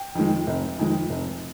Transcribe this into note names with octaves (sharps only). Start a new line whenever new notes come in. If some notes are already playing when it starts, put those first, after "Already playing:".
Already playing: G5
F2 D#3 G#3
F1
F2 D#3 G#3
F1